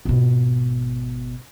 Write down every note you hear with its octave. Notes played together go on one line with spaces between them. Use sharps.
G#1 B2